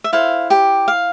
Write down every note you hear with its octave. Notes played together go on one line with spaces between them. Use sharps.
E5
E4 A4 C5 F5
G4 G5
F5